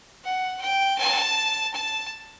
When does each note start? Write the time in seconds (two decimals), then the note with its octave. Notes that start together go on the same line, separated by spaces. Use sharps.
0.24 F#5
0.61 G5
0.98 A5
1.74 A5